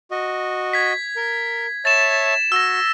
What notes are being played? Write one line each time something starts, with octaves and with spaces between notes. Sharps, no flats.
F#4 D#5
G#6 B6
A#4
C#5 E5 A5 A6 E7
F#4 E6 A#6